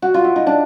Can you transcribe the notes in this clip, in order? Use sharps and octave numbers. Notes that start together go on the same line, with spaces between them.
F#4
F4
E4
D#4
D4